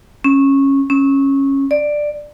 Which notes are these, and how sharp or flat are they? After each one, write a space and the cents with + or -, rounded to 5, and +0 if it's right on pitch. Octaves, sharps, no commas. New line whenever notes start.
C#4 -15
C#4 -15
D5 +10